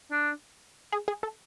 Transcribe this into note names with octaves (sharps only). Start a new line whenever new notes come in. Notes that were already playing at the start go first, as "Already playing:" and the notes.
D4
G#4
G#4
A4